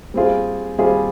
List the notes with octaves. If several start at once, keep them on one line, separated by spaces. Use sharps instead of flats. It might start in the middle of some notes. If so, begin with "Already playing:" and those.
G3 C4 F4 G#4
G3 C4 F4 G#4